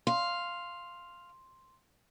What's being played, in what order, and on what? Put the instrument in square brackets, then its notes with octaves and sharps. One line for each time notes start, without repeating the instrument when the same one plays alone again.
[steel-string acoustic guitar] F5 [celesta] C6